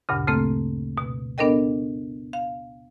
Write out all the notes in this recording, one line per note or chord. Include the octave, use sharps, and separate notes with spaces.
D2 G2 A#2 C#3
C#3 A3 A#3 C4 A4
B2
B3 D4 A4 A#4 D#5 G5
F5